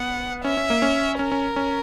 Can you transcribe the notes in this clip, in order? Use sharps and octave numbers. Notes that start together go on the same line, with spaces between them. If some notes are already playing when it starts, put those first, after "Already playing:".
Already playing: B3 F#5
C#4 E5
C#4
A#3
C#4
C#4 A#4
C#4
C#4